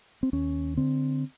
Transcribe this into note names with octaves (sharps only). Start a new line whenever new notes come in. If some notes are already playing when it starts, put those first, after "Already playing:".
C4
D#2 C#4
D3 C4